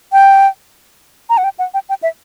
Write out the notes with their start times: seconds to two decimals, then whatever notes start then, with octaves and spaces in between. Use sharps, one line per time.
0.13 G5
1.29 A#5
1.38 F#5
1.44 G5
1.59 F#5
1.74 G5
1.89 G5
2.03 E5